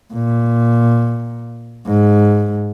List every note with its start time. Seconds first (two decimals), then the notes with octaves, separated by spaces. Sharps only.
0.14 A#2
1.87 G#2